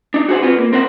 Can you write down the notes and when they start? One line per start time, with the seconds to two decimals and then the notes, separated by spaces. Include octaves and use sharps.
0.14 D4 D#4
0.29 F#4 G#4 C5 F#5
0.42 B3 C4 F4
0.59 A#3
0.73 C4 A#4 C5 F#5